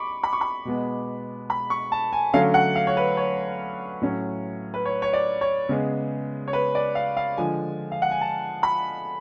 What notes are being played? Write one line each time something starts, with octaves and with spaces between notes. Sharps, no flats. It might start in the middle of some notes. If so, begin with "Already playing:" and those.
Already playing: B5 C#6 D6
B5
C#6
B5
B2 G#3 B3
B5
C#6
A5
G#5
D3 F#3 A3 C#4 F5
F#5
F5
C#5
B4
C#5
A2 F#3 C#4
B4
C#5
C#5
D5
C#5
C#3 G#3 B3
C#5
B4
D5
F5
F5
D3 F3 G#3 G#5
F5
F#5
G#5
A5
B5